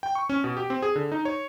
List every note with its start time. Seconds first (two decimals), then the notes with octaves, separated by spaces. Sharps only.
0.03 G5
0.15 C#6
0.29 C#4
0.44 B2
0.57 G4
0.70 C4
0.82 G#4
0.96 D3
1.12 D#4
1.25 C#5